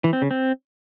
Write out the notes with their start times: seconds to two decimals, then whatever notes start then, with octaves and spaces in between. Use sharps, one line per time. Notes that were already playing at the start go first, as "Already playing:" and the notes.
0.04 E3
0.13 C4
0.22 C#3
0.31 C4